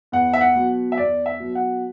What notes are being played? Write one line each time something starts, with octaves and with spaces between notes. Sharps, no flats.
E2 F#5
E5
F#5
B2 F#3
E5
E2 D5
E5
B2 F#3
F#5